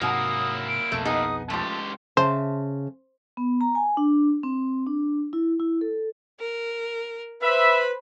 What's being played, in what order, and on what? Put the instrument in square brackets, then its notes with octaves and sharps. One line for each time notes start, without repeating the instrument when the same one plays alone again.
[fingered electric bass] G#2 C3 [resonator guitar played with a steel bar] F#3 G#5 [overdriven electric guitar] A#3 E4 [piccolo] D#6
[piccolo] D7
[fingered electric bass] B1 F2 B2 [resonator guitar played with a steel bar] A3
[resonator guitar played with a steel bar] B3 D#4 G#4 [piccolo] D#6
[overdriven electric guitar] C#2 G4 [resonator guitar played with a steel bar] F3 A3 [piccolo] C6
[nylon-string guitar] C#3 E5 A5 [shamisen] C5
[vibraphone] B3
A#5
G#5
D4
C4
D4
E4
E4
A4
[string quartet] A#4
[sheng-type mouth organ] B4 [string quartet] C5 B5 [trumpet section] E5